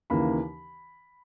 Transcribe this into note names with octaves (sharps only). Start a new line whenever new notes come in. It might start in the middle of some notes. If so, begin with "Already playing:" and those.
D#2 C#3 E3 A#3 B5